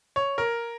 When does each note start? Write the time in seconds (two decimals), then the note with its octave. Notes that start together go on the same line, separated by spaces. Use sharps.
0.16 C#5
0.38 A#4